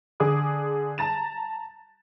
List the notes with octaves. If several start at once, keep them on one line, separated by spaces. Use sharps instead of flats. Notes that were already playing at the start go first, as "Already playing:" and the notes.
D3 G#4 D6 D#6
A5 A#5 A6 E7